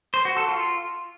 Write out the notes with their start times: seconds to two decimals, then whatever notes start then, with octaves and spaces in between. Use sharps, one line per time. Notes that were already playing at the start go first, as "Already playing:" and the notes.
0.14 C5
0.25 F#4
0.37 A4
0.48 F4